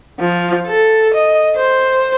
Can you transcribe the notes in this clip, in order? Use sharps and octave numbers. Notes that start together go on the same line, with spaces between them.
F3
A4
D#5
C5